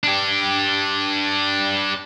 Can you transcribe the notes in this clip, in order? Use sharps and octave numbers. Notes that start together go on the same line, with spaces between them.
D4 G4